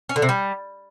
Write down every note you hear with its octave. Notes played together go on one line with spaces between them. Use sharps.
C#4
D3
C3
G3